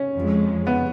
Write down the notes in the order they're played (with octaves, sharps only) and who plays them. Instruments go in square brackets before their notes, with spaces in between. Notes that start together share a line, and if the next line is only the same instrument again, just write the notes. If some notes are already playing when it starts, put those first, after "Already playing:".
Already playing: [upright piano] C#4
[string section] F2 F3 G#3
[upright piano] B3